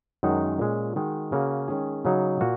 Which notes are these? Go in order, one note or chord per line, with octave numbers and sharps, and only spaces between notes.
F#2 D#3 G#3 D#4 F#4
A#2 G#3 C#4
D#3 G#3 D#4 F#4
C#3 A#3 F#4
D#3 G#3 C#4 G#4
C#3 F#3 D#4 F#4
A#2 A#3 F#4